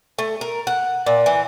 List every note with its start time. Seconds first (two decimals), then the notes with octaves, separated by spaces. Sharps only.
0.19 A3
0.41 A#4
0.67 F#5
1.06 A#2
1.26 E3